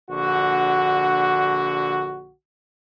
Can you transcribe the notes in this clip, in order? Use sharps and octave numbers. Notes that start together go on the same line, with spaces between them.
A#1 D3 F#4